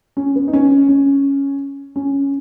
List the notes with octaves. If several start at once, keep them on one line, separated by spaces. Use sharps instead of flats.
C#4
B3
D#4
C#4
C#4
C#4